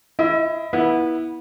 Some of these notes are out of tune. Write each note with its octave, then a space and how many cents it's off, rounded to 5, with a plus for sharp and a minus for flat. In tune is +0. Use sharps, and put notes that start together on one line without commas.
E4 +15 D#5 +35
B3 -20 E4 -15